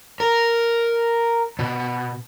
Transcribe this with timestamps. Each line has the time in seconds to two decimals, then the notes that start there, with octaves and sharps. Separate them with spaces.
0.20 A#4
1.59 B2